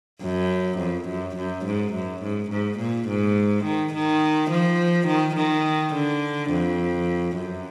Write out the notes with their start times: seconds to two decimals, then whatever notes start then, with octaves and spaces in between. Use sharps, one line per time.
0.22 F#2
0.79 F2
1.08 F#2
1.36 F#2
1.65 G#2
1.93 F#2
2.23 G#2
2.51 G#2
2.79 A#2
3.08 G#2
3.65 D#3
3.93 D#3
4.51 F3
5.07 D#3
5.36 D#3
5.94 D3
6.51 F2
7.36 F#2